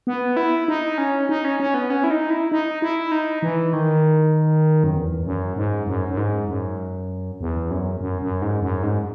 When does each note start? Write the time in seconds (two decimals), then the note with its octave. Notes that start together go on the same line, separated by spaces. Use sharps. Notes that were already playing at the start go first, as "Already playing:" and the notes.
0.07 B3
0.37 E4
0.68 D#4
0.98 C#4
1.29 D#4
1.45 C#4
1.60 C#4
1.74 B3
1.90 C#4
2.04 E4
2.11 D#4
2.30 E4
2.52 D#4
2.82 E4
3.12 D#4
3.42 E3
3.73 D#3
4.84 F#2
4.96 E2
5.26 F#2
5.56 G#2
5.87 F#2
6.09 F#2
6.17 G#2
6.49 F#2
7.41 E2
7.71 F#2
8.01 F#2
8.22 F#2
8.42 G#2
8.62 F#2
8.83 G#2